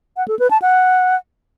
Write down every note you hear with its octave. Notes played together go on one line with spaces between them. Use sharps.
F#5
A4
B4
A5
F#5